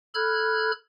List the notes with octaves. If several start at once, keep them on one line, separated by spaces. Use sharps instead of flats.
A4 B5 F6 F#6 G#6